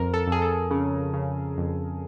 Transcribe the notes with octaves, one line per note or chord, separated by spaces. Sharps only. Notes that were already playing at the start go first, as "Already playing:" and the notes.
Already playing: F2 A#4
A4
F2
G#4
A4
C#3
C#3
F2